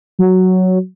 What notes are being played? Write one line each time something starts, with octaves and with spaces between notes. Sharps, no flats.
F#3